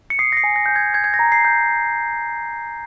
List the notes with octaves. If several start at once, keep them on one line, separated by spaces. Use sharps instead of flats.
C#7
D#6 C7
A#6
C7
G#5
A#6
G#5 G6
G#6
G6 G#6
G#6
A#6
A#5
C7
G6